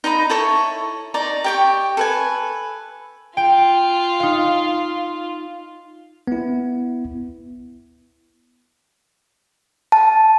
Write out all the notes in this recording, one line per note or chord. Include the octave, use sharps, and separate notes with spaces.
D#4 D#5 A#5 B5
E4 A4 C#5 C#6
D#4 D5 A#5
G4 G5 C#6
A4 B4 G#5
F4 G5
D#4 F5
B3 E4
A5